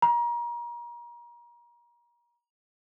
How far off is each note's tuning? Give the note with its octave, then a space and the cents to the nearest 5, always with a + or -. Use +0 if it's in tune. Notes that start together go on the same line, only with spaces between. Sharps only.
A#5 +35